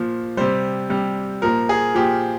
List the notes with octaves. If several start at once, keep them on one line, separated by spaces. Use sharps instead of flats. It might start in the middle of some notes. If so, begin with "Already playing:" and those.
Already playing: A#2 F3
C3 G3 C5
C3 G3
A#2 F3 A#4
G#4
A#2 F3 G4